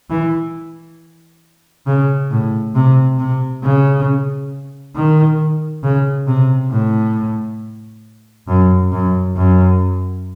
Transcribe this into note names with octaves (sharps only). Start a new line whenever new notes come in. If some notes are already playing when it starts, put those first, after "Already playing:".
E3
C#3
A2
C3
C3
C#3
D#3
C#3
C3
A2
F#2
F#2
F#2